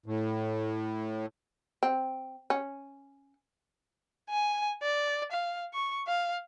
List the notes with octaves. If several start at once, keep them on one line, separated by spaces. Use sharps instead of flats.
A2
C4
C#4
G#5
D5
F5
C#6
F5